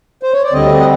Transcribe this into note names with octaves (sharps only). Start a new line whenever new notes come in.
C5
C#5
D5
D2 D3 G3 C4 D#5
F#5